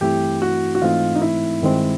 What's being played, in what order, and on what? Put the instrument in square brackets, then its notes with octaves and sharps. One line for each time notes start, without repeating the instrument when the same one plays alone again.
[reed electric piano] G2 E3 A3 C4 E4 [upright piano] G4
[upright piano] F#4
F#4
[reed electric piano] G#2 E3 A3 C4 D#4 [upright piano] F4
[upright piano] D#4
E4
[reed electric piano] G2 D#3 G#3 C4